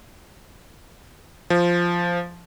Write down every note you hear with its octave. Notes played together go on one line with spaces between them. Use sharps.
F3